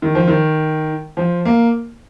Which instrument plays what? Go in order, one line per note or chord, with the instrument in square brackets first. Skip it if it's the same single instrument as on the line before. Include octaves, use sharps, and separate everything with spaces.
[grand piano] D#3
F3
D#3
F3
A#3